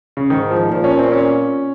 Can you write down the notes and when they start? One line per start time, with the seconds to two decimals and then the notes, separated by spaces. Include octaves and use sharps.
0.17 C#3
0.30 G#2 D#3
0.51 F3
0.72 A#2 F3
0.84 C#4
0.99 C4
1.12 C#4